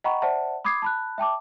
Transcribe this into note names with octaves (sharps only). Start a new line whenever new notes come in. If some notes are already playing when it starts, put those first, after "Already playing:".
D#5 F#5 G5 A#5 B5 C#6
C5 D5 E5 F#5 A5
B5 D6 D#6 G#6 C7
A5 B5 F#6
E5 G5 A5 D6